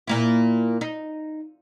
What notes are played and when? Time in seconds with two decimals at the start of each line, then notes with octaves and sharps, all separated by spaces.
0.08 A#2 A#3 E4
0.81 D#4